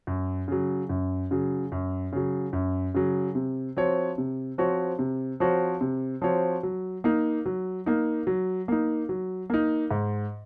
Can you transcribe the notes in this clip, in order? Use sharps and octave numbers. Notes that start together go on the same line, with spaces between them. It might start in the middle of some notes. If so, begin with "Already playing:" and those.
F#2
C#3 F#3
F#2
C#3 F#3
F#2
C#3 F#3
F#2
C#3 F#3
C3
F3 C4 F#4 C#5
C3
F3 C4 F#4 C#5
C3
F3 C4 F#4 C#5
C3
F3 C4 F#4 C#5
F#3
A#3 D#4
F#3
A#3 D#4
F#3
A#3 D#4
F#3
A#3 D#4
G#2